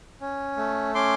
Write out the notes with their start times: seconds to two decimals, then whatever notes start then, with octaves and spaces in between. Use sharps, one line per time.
0.21 C#4
0.57 A3
0.95 C#4 C6 D6